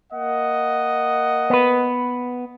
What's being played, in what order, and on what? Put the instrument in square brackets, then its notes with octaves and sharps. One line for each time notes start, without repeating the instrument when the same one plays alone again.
[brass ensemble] A#3 D#5 F#5
[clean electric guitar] B3 B4